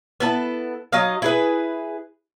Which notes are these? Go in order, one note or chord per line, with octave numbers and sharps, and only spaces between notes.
B3 E4 A4
F#3 D#4 D#5 F5
E4 G#4 B4